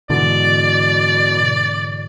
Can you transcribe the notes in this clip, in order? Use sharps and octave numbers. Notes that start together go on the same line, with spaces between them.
G#2 B2 D3 E3 D5